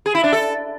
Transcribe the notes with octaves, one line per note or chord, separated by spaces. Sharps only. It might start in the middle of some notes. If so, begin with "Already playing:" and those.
G#4
E4
D4
A4